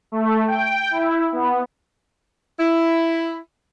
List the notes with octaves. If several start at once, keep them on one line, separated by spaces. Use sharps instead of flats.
A3
G5
E4
B3
E4